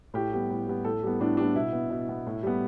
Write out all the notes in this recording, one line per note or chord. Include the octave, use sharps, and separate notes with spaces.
A2 G4
G3 B3
A2
G3 B3
A2 A4
G3 B3
A2 D4
G3 B3 D4
B2 E4
B3
B2
B3
A2
G3 B3